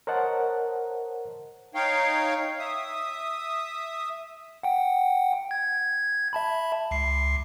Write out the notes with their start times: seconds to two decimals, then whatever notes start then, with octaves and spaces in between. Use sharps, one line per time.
0.07 A#4 C5 C#5 D#5 F#5 A5
1.75 D#4 C#5 F5 G5
2.59 E5 D#6
4.63 F#5 G5
5.51 G#6
6.33 E5 A5 B5
6.91 C#2 C7